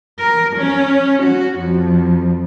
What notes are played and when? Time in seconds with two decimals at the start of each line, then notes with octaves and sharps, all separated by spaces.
0.19 A#4
0.56 C#4
1.23 F#4
1.58 F2